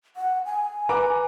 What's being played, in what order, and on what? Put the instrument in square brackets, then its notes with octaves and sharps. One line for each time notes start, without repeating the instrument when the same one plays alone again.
[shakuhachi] F#5
G#5
[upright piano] B4 A#5 D6